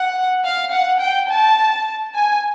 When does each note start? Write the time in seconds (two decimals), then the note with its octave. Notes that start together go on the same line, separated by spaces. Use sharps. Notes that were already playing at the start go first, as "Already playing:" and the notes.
Already playing: F#5
0.44 F5
0.72 F#5
1.00 G5
1.30 A5
2.14 G#5